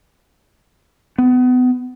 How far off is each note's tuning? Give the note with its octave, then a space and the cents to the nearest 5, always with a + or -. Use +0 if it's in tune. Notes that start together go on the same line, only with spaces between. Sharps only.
B3 +30